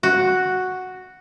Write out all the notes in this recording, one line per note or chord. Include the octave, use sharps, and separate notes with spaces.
F#4